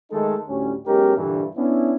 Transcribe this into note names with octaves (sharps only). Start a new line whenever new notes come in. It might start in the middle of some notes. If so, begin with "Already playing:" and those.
D#3 G#3 A3 D#4 A4
D2 A2 G3 C#4
B1 G#3 C#4 D#4 G4 A#4
G2 A#2 D3 E3
B3 C#4 D4 E4